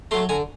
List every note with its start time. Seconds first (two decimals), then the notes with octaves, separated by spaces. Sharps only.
0.11 F#3 A3 A#5 C6
0.29 D3 G#5 A#5